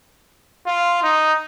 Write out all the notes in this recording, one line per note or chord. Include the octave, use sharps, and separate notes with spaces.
F4
D#4